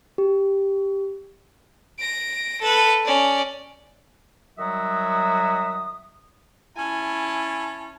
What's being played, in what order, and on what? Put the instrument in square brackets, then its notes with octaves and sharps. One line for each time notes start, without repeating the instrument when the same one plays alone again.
[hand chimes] G4
[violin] A#6 D7
A4 B4
C#4 D5
[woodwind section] D#3 F#3 G3 F#4 E5 D#6
[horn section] C#4 E4 A5 [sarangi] G#5